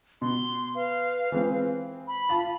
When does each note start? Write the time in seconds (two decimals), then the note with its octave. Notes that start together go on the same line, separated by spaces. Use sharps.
0.22 B2 C6
0.75 B4 F5
1.32 E3 G#3 C4
2.08 B5
2.29 F4 F5 A5